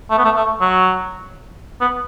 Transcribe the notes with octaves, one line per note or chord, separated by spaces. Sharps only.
A3
B3
A3
A3
F#3
B3